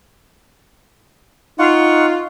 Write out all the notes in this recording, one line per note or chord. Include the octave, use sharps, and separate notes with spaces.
D#4 F4 F#5 C#6